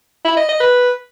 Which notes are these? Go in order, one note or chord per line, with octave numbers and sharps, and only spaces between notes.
E4
D#5
D#5
B4